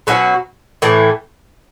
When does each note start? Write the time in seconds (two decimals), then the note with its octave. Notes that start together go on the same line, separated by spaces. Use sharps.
0.07 B2 F#3 C#4 F#4
0.82 A2 E3 A3